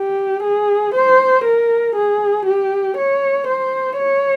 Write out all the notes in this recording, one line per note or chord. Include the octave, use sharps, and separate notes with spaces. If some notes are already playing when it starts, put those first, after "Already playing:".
Already playing: G4
G#4
C5
A#4
G#4
G4
C#5
C5
C#5